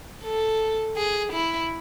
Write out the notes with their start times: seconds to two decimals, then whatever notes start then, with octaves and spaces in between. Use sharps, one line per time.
0.24 A4
0.97 G#4
1.33 E4